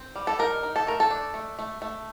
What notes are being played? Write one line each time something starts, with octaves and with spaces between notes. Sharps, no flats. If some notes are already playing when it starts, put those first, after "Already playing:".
Already playing: C4
G3
A4
D#4 A#4
D#4
A4
A3 A#4
A4
D4
A3
A3
A3